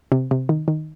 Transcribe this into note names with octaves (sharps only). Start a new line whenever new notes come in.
C3
C3
D#3
D#3